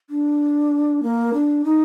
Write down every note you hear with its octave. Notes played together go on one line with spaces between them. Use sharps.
D4
A#3
D4
D#4